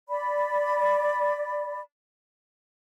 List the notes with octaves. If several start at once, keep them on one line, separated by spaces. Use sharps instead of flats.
D5 B5